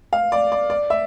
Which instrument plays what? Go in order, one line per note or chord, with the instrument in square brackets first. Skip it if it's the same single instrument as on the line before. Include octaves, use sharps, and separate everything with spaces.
[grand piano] F5
D5
D5
D5
E5